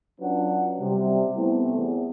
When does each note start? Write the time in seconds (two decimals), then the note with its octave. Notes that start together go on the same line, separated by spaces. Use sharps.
0.20 F#3 C#4 D4 F4 B4 F#5
0.80 C3 G3
1.37 A3 B3 C4 E4
1.76 E2